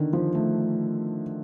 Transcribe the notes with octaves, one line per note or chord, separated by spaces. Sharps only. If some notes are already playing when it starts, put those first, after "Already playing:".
Already playing: D3 D#3
F3
A3